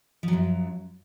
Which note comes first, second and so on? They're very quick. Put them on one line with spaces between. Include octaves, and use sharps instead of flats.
F3 F#3 F#2